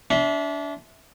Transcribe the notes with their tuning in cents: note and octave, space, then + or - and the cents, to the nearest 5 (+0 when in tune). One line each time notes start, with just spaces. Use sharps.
D4 -30 E5 -15 C6 +0